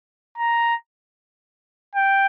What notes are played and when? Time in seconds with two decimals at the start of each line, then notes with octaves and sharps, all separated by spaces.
0.38 A#5
1.95 G5